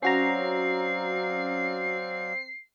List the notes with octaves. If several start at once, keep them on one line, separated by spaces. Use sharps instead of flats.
F#3 C4 C#4 F#4 D5 F5 A#5 C7